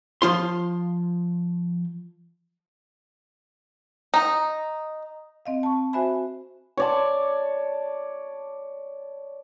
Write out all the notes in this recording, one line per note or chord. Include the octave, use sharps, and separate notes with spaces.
F3 F4 C6
D#4
C4 D#5 F5
A5 C#6
F#4 C5 E5 G#5 B5
C#5 D5 A5